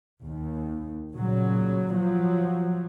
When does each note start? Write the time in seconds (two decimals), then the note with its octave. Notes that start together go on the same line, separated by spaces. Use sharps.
0.24 D#2
1.13 A#2 C#3 F#3
1.91 F3 F#3